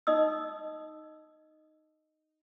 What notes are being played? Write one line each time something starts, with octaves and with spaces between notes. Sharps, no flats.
D#4 D#5 D#6 E6